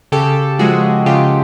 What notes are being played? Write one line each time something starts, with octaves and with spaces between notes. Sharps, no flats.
C#3 G4 A4
F3 G#3 F#4 G#4
C#3 F4 G4